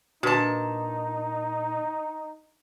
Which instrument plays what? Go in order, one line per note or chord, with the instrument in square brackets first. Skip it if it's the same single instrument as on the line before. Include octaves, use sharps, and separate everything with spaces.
[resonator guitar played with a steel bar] A#2 A5 [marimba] D4 B4 [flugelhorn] D#4 [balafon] F#4